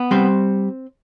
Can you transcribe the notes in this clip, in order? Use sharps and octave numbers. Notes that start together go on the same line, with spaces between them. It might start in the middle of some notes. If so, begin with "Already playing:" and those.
Already playing: B3
G3 C4 C5